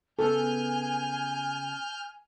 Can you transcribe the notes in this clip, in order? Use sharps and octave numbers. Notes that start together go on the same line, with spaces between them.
C#3 B3 A4 G#5 F6 G6